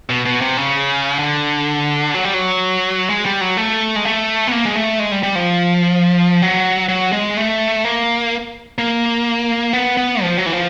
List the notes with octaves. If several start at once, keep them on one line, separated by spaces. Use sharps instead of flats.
B2
B2
C3
C#3
D3
F#3
G3
F#3
G#3
G3
F#3
A3
G#3
A3
B3
A#3
G#3
A3
G#3
G3
G3
F3
F#3
F#3
G#3
A3
A#3
A#3
B3
B3
F3
F#3
E3
F3